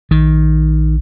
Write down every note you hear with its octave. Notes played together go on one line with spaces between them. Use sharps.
A#1 D#3